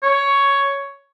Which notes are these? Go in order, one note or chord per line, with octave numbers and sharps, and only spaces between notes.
C#5